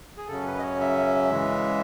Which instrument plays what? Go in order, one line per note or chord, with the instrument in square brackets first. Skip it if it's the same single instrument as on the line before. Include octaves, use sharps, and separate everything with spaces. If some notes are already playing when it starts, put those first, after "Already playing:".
[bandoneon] G#4
F#2 C#3 F#3 C#4 A4
B4
D#5
C#5
E5
C#3 E3 G#3